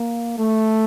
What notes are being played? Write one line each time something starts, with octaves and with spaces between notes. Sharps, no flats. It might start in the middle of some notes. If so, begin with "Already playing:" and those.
Already playing: A#3
A3